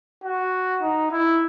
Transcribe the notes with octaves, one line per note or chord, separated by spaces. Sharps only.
F#4
D#4
E4